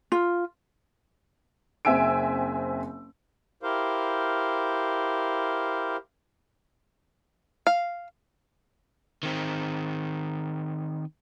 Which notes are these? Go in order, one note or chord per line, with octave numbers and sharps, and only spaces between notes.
F4
F#1 C4 E5 G#5 E6 D7
E4 G4 A#4 C5 F5
F5
D#3 C4